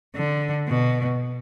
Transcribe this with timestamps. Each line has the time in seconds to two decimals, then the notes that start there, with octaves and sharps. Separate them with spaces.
0.16 D3
0.68 B2